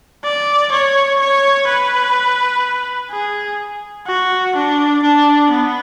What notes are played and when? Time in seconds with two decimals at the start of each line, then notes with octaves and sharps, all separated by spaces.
0.24 D5
0.72 C#5
1.20 C#5
1.67 B4
3.11 G#4
4.07 F#4
4.55 D4
5.02 D4
5.50 B3